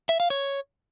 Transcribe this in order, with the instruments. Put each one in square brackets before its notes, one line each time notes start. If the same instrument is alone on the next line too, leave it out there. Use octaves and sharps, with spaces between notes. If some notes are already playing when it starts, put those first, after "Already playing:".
[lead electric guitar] E5
F5
C#5